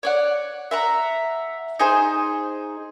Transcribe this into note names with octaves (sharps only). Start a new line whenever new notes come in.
C#5 D5 F#5
E5 F#5 A#5
D#4 G#4 C5